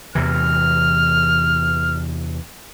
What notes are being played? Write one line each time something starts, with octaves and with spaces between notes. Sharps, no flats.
E2 C3 E3 F6